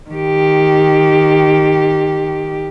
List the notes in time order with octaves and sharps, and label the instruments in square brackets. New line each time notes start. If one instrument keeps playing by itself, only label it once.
[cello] D#3 G4